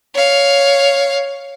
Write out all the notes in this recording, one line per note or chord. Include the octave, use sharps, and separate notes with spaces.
C#5 F5